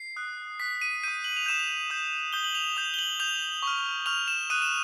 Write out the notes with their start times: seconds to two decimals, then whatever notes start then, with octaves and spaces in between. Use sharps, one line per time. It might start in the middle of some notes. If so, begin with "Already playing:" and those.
Already playing: C7
0.16 D#6 F#6
0.60 D#6 F#6 B6
0.82 D#7
1.04 D#6 G6 D#7
1.24 F#7
1.37 F7
1.46 D#6 G6 E7
1.60 F7
1.90 D#6 G6
2.33 D#6 G6 G7
2.44 F#7
2.55 F7
2.76 D#6 G6 F7
2.94 G7
2.99 F#7
3.20 D#6 G6 F7
3.63 C#6 F6
4.06 C#6 F6 F7
4.28 E7
4.50 D#6 F#6 D#7
4.62 E7